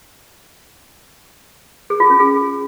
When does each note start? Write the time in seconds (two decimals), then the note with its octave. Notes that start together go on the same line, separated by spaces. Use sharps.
1.90 G#4
2.00 F4
2.10 C#4
2.20 G#4